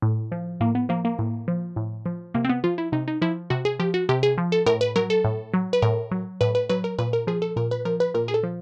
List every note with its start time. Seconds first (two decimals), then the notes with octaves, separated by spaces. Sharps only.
0.02 A2
0.32 F3
0.61 A2 A#3
0.75 B3
0.89 F3 A#3
1.05 A#3
1.19 A2
1.48 F3
1.76 A2
2.06 F3
2.34 C3 A#3
2.45 C4
2.49 B3
2.64 F3 F4
2.78 E4
2.92 C3 D#4
3.08 D#4
3.22 F3 E4
3.50 C3 F#4
3.65 G#4
3.80 F3 G4
3.94 F#4
4.09 C3 G4
4.23 G#4
4.38 F3
4.52 A4
4.66 A2 A#4
4.81 B4
4.96 F#3 A#4
5.10 A4
5.24 A2
5.54 F#3
5.73 B4
5.82 A2 A#4
6.11 F#3
6.41 A2 B4
6.55 B4
6.69 F#3 B4
6.84 A#4
6.99 A#2 B4
7.13 A#4
7.27 F3 G#4
7.42 A4
7.56 A#2 A#4
7.71 B4
7.85 F3 A#4
8.00 B4
8.14 A#2 A#4
8.28 G#4
8.34 A4
8.43 F3